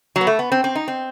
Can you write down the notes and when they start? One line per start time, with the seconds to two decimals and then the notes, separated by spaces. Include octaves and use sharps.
0.16 F#3
0.21 B3
0.27 A3
0.39 B3
0.52 C4
0.64 C4
0.75 D#4
0.88 C4